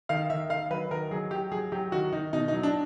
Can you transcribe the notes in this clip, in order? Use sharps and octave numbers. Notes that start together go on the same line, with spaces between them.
D#3 F5
D#3 E5
D#3 F5
F#3 B4
D#3 A#4
F#3 G#4
F#3 G4
F#3 G#4
F#3 G4
D#3 F#4
D#3 D#4
B2 D#4
D#4
F#3
D4